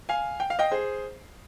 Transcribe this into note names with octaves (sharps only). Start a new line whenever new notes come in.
F5 G#5
G5
F5
D#5 G5
G#4 C5